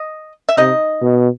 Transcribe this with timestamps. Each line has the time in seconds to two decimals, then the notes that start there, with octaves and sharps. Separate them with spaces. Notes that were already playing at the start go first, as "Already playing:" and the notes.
Already playing: D#5
0.49 E5
0.57 C3 D#4 D#5
1.02 B2